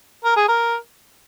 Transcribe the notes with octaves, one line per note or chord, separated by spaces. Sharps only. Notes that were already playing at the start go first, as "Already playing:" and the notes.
A#4
G#4
A#4